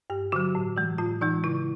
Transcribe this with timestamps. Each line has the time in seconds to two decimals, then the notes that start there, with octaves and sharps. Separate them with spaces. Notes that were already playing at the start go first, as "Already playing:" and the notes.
0.10 G2 G4
0.32 D3 F#3 F#4
0.55 A2
0.76 E3 G#3
0.98 A2 F4
1.21 E3 G#3 D#4
1.44 C#3 E4